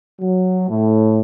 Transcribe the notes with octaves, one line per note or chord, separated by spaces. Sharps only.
F#3
A2